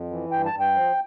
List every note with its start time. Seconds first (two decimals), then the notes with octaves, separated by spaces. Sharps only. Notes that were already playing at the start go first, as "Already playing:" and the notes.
Already playing: F2
0.10 E3
0.31 G2 G5
0.45 A5
0.53 G2
0.60 G5
0.74 F3